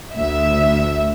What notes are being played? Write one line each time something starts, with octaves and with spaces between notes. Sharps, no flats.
D2 E5